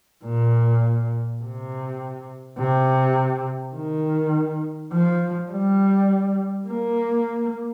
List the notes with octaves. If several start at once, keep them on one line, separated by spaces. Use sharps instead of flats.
A#2
C3
C3
D#3
F3
G3
A#3